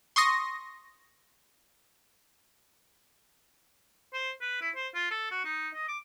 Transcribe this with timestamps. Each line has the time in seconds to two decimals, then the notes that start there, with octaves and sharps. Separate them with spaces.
0.16 C6 C#6 D#6 A#6
4.14 C5
4.41 B4
4.61 E4
4.76 C5
4.94 F4
5.11 A4
5.31 F#4
5.45 D#4
5.74 D#5
5.88 D6